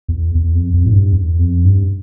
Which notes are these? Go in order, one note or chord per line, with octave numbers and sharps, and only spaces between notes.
E2
E2
F2
F2
A2
G2
E2
F2
G2